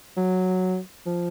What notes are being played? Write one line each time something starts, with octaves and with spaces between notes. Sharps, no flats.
F#3
F3